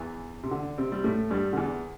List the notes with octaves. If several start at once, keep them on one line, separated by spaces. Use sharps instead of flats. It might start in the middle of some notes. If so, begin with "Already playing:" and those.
Already playing: E2 E3
C3
D3
C3 C4
G3
A2 A3
G2 G3
D3
E2 E3